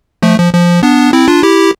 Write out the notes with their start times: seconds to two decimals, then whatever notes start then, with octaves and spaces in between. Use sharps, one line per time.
0.22 F3 A3
0.38 F3
0.53 F3
0.83 B3 D4
1.13 C4 E4
1.28 D4 F4
1.43 E4 G4